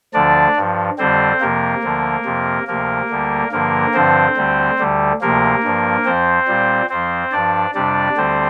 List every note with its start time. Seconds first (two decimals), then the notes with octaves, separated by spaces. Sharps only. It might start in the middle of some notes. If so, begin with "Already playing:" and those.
0.14 D2 D3 F3 D4 D5
0.56 G2 F3
0.98 F2 D3 G3 C4 C5
1.40 F2 C3 F3 A#3 A#4
1.83 D2 D3 F3
2.25 F2 C3 F3
2.67 D2 C3 F3 A#3 A#4
3.09 D2 D3 G3
3.51 G2 D3 F3 A#3 A#4
3.94 G2 D3 F3 C4 C5
4.37 D2 D3 G3
4.78 D2 D3 G3
5.21 D2 C3 F3 A#3 A#4
5.63 G2 F3
6.05 F2 F3 C4 C5
6.48 A#2 G3
6.89 F2 F3 C4 C5
7.32 G2 F3 D4 D5
7.74 F2 C3 G3 D4 D5
8.17 D2 D3 G3 C4 C5